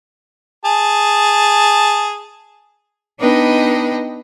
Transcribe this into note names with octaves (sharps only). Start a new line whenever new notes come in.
G#4 A5
B3 D4 D#4 B4 D#5 G5